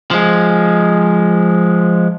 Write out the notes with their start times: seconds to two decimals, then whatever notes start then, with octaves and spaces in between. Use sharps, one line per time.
0.11 F3 G#3